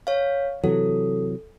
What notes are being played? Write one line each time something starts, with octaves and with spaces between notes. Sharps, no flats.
C#5 F5
C3 E3 F#3 A4